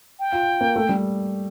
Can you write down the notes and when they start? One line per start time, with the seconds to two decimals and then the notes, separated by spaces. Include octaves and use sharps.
0.20 G5
0.32 F4
0.61 A#3
0.76 A3
0.89 G3